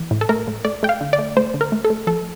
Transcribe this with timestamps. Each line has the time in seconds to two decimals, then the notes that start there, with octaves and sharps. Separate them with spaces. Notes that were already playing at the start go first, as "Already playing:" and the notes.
Already playing: E3
0.11 A2
0.21 A4
0.29 A3 A#4
0.48 A2
0.65 A3 D5
0.83 A3 G5
0.89 F5
1.01 D3
1.13 D5
1.19 A3
1.37 A3 C5
1.54 D3
1.61 A#4
1.72 A3
1.85 A4
1.90 A3
2.07 F3 A4